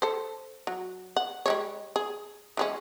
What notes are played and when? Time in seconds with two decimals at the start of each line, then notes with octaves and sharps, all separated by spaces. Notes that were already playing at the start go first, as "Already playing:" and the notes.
0.02 A4 C5
0.67 F#3
1.17 F#5
1.46 G3 G#3 C#5
1.96 G#4
2.57 E3 G#3 C#4